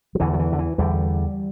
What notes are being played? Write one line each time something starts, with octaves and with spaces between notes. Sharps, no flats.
F#3
E2 D3 E3
F#3
E3
D3
E3
E2 D3 G3